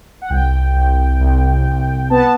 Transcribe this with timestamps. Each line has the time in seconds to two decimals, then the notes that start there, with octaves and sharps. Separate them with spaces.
0.22 F#5
0.30 C2 G5
0.76 C2
1.20 C2
1.65 C2
2.10 B3 A5